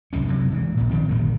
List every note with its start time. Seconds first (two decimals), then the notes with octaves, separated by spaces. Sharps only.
0.13 C2 F#2 E3 C#4
0.28 C3 F#3
0.52 G#2 E3
0.77 A#1 A#2
0.91 D#3 F3 C4
1.08 G1 G2 A#2 D#3